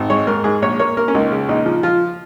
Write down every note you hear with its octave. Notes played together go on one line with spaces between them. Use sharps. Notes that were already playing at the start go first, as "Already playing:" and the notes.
Already playing: G#1
G#3 C#5
G#2 A#4
G#2 G#4
A#1 C#5
A#3 C#5
A#3 A#4
C#4
C#2 D#4
C#3
A#1 D#4
F3
F3 F4